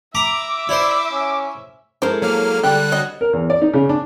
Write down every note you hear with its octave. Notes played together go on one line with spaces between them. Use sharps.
E5 A#5 B5 D6
E4 C5 D5
C#4
G#3 E4 A4 A#4 C5
F#3 A#3 F6
D3 G3 G4 F#6
F#4 C#5 D#5
A#4
E2
D5
D#4
C#3
D4